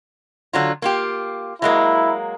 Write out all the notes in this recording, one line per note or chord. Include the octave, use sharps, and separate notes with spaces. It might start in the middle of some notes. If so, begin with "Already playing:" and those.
D3 F#3 F4
A#3 F4 G4
F#3 G#3 A#3 E4